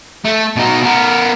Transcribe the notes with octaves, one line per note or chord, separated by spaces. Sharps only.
A3
B2 D#4
B3 A#4